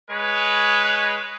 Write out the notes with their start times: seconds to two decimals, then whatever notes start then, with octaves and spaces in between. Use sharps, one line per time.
0.11 G#3 B4 C#5